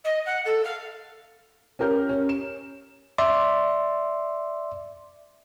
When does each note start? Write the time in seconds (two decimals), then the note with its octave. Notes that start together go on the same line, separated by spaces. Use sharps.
0.04 D#5
0.25 F#5
0.45 A4
0.64 F5
1.79 C#4 G4 A#4 G6
2.09 C#4
2.29 E7
3.18 D5 E5 C6